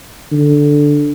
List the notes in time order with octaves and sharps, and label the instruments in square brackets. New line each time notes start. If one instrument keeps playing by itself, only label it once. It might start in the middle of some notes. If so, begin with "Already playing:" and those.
[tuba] D3